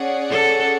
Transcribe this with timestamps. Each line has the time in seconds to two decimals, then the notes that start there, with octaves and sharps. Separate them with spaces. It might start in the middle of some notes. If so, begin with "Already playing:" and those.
Already playing: C#4 G#4 D5 F#5
0.30 A4